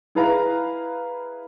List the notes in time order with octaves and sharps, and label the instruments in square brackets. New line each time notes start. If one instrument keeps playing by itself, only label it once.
[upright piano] E4 G#4 B4 F5 A#5